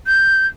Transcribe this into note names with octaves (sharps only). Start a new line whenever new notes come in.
G6